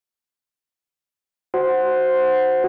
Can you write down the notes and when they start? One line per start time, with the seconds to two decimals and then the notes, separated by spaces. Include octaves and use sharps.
1.54 F#4 C5